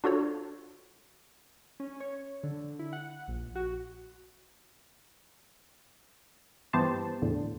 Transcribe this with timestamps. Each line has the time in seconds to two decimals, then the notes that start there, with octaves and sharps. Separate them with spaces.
0.04 D4 F4 F#4 A4 C5 C#5
1.80 C#4
2.00 C#5
2.43 D3
2.79 E4
2.93 F#5
3.28 A#1
3.55 F#4
6.73 G2 E3 B3 G4 C5 A5
7.22 E2 A2 D3